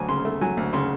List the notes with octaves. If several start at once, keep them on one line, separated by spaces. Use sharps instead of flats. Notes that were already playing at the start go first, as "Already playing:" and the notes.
Already playing: D2 F#3 G#5
C#3 C6
A3
F#3 G#5
D2
C#3 C6